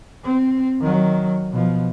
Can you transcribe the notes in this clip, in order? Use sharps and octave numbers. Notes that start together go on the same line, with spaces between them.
C4
D#3 F#3
B2 F3